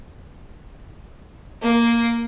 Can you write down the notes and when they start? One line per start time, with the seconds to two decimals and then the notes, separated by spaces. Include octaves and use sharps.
1.62 A#3